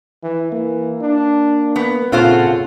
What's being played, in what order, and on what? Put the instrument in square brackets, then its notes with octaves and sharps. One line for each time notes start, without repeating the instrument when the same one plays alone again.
[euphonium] E3
[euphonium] E3 [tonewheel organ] A#3
[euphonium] D4
[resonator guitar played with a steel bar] B3
[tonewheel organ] A#2 A4 F#5 [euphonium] C#3 [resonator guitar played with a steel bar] C4 F4 C5